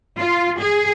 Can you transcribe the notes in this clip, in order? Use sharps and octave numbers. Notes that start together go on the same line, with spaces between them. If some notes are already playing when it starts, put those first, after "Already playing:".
F4
G#4